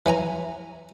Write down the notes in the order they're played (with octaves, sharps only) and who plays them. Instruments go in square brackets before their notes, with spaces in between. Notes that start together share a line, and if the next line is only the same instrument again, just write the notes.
[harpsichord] E3 C#5 G#5 A#5